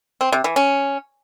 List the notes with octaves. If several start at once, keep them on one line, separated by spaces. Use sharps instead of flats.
C4
C3
E3
C#4